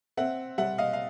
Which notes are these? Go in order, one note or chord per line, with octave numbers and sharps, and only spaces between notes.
C4 E5 F#5
G3 E5 F#5
D#5 F5
F5